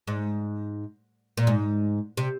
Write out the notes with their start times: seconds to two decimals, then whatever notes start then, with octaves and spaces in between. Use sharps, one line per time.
0.07 G#2
1.37 A#2
1.47 G#2
2.17 C3